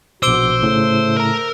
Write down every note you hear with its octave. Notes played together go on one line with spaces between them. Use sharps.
A#1 B2 F#4 C5 D6 E6 D7 G7
A2 C#3 A3
A#4 A#5